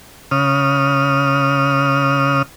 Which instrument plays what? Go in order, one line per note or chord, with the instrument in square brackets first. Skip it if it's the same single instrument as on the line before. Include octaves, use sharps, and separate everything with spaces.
[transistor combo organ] C#3 D#6 F6